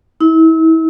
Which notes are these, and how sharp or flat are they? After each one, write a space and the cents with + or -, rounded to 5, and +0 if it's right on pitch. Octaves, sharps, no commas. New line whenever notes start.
E4 -35